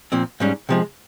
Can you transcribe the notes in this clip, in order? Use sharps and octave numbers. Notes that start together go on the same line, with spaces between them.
A#2 F3 C4
G#2 G3 C#4
C3 F3 G#3